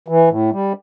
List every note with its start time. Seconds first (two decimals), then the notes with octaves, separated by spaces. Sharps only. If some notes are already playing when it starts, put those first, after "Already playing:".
0.08 E3
0.29 A2
0.52 G3